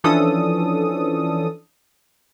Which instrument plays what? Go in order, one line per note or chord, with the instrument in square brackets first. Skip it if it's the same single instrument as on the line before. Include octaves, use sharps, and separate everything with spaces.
[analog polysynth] E3 F3 C#4 D4 A4 D#6